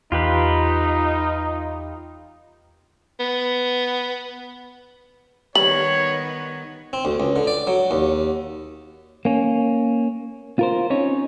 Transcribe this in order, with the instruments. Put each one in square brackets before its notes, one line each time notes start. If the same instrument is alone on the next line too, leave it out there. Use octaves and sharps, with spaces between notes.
[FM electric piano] E2 [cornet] D#4 [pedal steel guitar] F4 G4 B4
[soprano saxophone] B3
[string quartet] D#3 B3 [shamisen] G3 [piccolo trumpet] C#5 [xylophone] F#7
[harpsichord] C4
D2
C#2
D3
D5
F#3
D#2
[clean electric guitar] A#3 C#4
F4 A#4 C5
C4 C#4 D#4 C#5